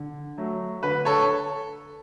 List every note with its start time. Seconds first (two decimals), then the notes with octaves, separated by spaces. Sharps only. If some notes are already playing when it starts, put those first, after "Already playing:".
Already playing: D3
0.38 F#3 A3
0.83 D3 B4
1.05 A4 C#5